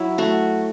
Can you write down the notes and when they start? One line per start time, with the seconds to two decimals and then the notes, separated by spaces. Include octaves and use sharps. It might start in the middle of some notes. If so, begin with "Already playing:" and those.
Already playing: F#3 E4
0.18 A3 F#4